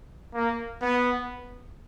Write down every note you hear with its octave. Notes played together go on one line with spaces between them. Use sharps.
A#3
B3